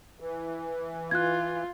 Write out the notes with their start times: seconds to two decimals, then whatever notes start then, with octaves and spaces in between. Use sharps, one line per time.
0.20 E3
1.11 F4 F#6 G#6